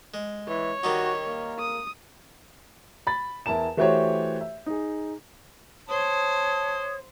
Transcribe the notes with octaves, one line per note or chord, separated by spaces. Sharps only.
G#3
E3 C#5
D#3 G3 D#4 F#4
A#3
D#6
B5 A6
E2 E4 A#4 A5 E7
E3 A3 F#4 G4 C5 C#5
E5
D#4 G#4
C5 C#5 A5 D#6